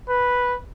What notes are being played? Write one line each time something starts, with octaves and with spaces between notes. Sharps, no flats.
B4